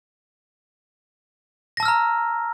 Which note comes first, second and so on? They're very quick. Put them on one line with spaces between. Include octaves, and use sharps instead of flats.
A#6 A5 E6 F6 A#5